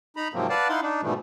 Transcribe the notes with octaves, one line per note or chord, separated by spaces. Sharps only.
D#4 A#5 B5
G#2 C3 F3 F#3 A#3 C4
B4 D5 F5 F#5 A5
D#4 E4 F5 F#5 C6
D4 D#4
G#2 B2 E3 F3 G3 A3